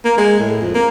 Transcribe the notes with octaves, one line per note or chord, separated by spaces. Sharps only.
A#3
G#3
A2
F2
A#3